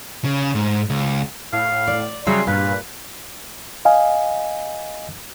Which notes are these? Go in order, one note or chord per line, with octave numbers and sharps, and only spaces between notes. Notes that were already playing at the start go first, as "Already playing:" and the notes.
C#3
G#2
C#2
A2 F5
D5
C#3 F#3 G3 G#4 E5 C6
G2 A#2 B4 F5
D#5 F5 G#5